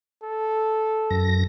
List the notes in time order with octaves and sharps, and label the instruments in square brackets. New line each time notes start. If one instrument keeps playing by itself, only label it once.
[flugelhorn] A4
[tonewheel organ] F#2 A#6